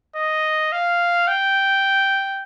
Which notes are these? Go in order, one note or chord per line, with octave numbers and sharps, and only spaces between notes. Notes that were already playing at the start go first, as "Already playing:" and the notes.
D#5
F5
G5